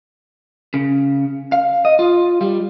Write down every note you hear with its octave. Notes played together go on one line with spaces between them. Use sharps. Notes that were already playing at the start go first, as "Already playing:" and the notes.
C#3
F5
D#5
F4
G3